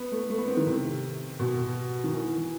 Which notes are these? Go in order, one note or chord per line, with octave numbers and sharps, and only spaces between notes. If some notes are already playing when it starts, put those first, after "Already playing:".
Already playing: B3
A3
A3
B3
C4
D#3
C3
B2
D#3
E3
E3